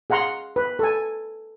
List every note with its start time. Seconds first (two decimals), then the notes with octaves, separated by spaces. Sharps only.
0.10 G#4 F5 F#5 A#5 C6
0.56 B4
0.79 A4 G#5